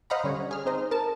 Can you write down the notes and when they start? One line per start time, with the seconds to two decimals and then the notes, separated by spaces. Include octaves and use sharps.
0.10 C5 D#5 F5 F#5 A#5 B5
0.24 D3 G3 C#4 C#5
0.51 G#4 F6
0.65 C4 D#4 C5 D#5
0.91 A#4 A5